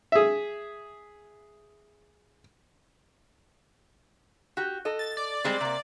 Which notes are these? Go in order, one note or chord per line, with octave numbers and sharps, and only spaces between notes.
G#4 E5
F#4 G4
A4 D#5
A6
D5
G3 G#3 C4
C3 A#3